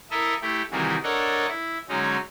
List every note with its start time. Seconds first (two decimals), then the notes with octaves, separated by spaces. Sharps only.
0.11 E4 A4 A#4 D#5 E5
0.42 A3 E4 G4
0.71 C3 D#3 E3 G3 F#4 G#4
1.03 D4 A4 A#4 C#5 D#5 F#5
1.48 E4
1.89 D3 F#3 G#3 C#4 D#4